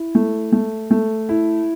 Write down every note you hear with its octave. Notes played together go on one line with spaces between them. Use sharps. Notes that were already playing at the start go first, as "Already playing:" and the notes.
Already playing: E4
A3
A3
A3
E4